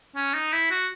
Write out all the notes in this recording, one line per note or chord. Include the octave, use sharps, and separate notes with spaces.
C#4
D#4
E4
F#4